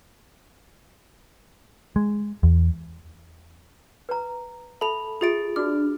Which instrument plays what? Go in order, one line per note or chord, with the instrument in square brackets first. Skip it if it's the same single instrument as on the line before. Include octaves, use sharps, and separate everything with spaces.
[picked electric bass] G#3
E2
[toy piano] B4 A#5
[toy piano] A4 E5 A5 [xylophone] B5 F7
[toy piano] F4 G4 E5 [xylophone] G#4 A6 D7
[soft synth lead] D4 [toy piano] F#4 D6 [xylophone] F6